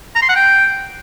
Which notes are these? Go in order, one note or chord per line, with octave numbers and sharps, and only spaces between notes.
A#5
C6
F#5
G5